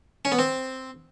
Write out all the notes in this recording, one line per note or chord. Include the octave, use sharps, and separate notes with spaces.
C#4
B3
C4